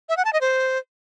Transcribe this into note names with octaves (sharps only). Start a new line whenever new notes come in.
E5
F#5
A5
D#5
C5